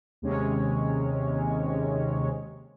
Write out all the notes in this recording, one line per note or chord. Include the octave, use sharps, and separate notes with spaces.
D#2 C3 G#3 C#4 C#5